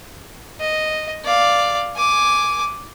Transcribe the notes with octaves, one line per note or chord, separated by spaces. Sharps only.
D#5
D5 F5
G#5 D6